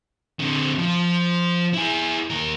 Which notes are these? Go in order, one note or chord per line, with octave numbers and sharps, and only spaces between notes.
D3 C4
F3
E4 G#4
D#2 A#4